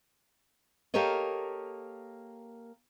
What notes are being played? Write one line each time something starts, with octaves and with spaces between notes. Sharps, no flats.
A#3 G4 A4 A#4 C#5 D#5